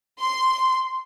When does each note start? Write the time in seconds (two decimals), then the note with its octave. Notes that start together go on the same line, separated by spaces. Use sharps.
0.18 C6